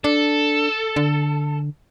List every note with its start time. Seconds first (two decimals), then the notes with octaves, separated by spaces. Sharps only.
0.04 D4 A4
0.96 D3